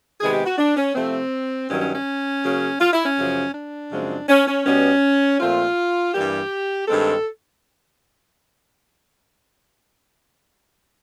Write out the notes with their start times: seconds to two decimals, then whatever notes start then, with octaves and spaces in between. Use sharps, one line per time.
0.21 C3 D#3 G#3 B3 G#4
0.33 G4
0.45 F#4
0.58 D4
0.77 C#4
0.95 C3 F3 A3 C4
1.69 G2 D#3 F#3 C#4
1.81 C#4
1.94 C#4
2.43 C#3 F#3 A#3
2.80 F4
2.93 E4
3.05 C#4
3.17 F#2 C#3 F3
3.54 D4
3.92 F#2 C#3 F3 G#3 C4
4.29 C#4
4.47 C#4
4.66 B2 G3 B3 C#4
5.40 A#2 F3 A3 C4 F4
6.14 G2 E3 G3 A#3 G4
6.88 G2 D#3 G#3 C4 A4